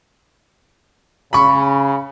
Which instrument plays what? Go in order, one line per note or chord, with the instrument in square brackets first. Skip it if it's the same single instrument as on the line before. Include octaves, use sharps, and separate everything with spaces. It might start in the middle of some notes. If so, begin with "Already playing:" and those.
[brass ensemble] C#3 [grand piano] B5 C#6